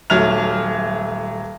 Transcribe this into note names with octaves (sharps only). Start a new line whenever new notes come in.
D#1 F#3 A3 E5 F6 F7